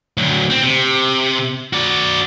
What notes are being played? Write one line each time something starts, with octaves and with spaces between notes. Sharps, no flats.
D2 F#3
C4
C3
F#4 D5